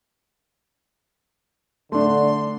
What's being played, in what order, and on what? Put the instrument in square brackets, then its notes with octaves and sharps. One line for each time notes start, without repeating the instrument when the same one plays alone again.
[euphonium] D3 [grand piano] A3 D4 [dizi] C6